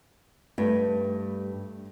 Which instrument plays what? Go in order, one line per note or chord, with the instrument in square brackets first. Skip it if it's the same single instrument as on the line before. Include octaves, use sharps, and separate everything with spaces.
[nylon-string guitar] G2 [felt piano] A3